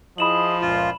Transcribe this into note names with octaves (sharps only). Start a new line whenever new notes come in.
F3 E4 G#4 D#5 B5 E7 F#7
C#2 F#2 A#2 F4